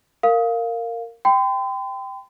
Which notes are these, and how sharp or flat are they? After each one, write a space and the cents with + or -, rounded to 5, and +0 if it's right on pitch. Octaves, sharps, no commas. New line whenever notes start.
A#4 -15 F5 +0
G5 +0 C6 -45